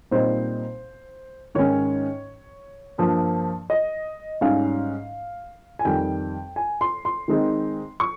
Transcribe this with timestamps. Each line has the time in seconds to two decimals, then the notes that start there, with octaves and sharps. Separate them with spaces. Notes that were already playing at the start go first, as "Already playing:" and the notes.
0.11 A#2 G3 C4 D#4 C5
1.55 G#2 D#3 G#3 C#4 C#5
2.98 G2 F3 A#3
3.70 D#5
4.41 G#2 G3 C#4 F5
5.79 G#5
5.85 F2 D#3 G3 G5
6.56 G#5
6.81 C6
7.05 C6
7.28 D#3 G#3 C4 D#4
8.00 C#6